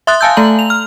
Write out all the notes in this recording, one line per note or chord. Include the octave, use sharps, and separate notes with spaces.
E5 C6 D#6 F#6 A6
F5 G#5 A5 E6 G6
A3 A4 A#5 F#7
F7
F6